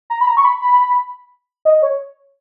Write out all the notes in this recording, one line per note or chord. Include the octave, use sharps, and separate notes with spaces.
A#5
B5
A#5
C#6
B5
B5
D#5
C#5